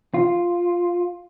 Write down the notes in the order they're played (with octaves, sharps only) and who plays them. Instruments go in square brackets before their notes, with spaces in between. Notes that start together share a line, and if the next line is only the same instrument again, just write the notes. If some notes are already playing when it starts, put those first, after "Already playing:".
[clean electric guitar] F4